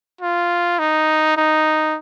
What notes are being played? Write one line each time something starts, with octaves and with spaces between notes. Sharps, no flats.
F4
D#4
D#4